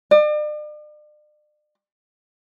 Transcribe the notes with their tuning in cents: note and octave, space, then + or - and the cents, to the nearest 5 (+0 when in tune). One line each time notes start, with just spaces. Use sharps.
D5 +40